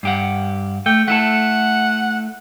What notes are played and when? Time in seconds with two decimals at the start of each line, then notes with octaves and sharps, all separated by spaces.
0.03 G2 G4 F#5
0.86 A3 G5
1.08 A3 E4 A4 F#5